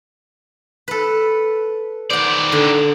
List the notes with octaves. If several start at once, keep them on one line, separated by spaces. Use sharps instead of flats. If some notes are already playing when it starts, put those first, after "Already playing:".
A4 B4
D#3 C5 D5 F#5
D3